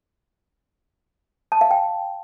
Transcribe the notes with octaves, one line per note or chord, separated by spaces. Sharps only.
A5
F5
G5